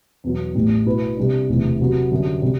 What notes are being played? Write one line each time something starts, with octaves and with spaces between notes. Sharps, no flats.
E2 B2 F#3
A1 A2 G3
B2 A3 E4 B4
C3 G3 D4
E1 D2 C3 E3 B3
C3 F#3 B3 F#4
F#2 D3 G3
C3 G3 C4